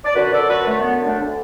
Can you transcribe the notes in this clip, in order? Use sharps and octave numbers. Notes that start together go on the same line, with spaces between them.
D5
F#2 D3 F#4 B4
A4 D5
F#4 B4
A3
B3
A3 D4
D2 D3